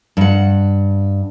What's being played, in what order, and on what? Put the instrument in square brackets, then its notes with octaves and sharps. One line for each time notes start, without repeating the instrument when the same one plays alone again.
[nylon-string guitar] G2 F#5